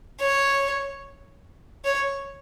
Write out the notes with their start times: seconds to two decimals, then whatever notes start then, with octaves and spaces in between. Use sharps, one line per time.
0.19 C#5
1.85 C#5